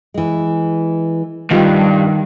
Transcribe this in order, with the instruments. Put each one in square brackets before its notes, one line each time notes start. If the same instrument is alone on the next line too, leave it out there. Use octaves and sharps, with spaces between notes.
[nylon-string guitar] E3 G#3
[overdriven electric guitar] D2 G2 [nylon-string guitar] D#3 F4 G4